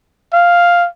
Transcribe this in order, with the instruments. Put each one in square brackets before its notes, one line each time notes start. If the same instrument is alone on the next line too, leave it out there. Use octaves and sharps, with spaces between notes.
[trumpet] F5